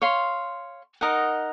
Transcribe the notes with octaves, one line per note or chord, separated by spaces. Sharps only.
C#5 F5 C6
D#4 A#4 D#5 F#5